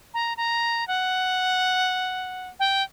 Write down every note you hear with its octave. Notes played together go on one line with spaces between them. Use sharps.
A#5
A#5
F#5
G5